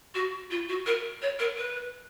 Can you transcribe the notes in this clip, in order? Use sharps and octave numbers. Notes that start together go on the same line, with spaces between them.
F#4
F4
F#4
A#4
C#5
A#4
B4